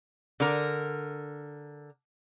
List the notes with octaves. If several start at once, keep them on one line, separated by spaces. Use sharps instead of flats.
D3 A#4